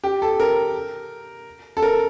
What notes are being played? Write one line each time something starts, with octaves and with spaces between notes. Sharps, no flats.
G4
A4
A#4
A4
A#4